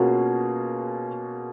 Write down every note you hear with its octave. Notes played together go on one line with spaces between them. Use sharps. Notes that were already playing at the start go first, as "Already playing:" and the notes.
Already playing: B2 A#3 C#4 F4 F#4 G#4 A#4